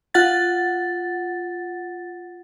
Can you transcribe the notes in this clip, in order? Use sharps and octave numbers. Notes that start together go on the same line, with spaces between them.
F4 F#5 A6